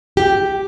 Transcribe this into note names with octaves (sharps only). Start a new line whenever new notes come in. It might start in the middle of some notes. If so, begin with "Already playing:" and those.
G4